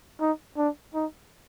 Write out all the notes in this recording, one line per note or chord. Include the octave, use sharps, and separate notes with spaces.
D#4
D4
D#4